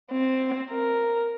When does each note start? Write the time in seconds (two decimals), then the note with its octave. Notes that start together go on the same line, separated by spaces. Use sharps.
0.12 C4
0.71 A#4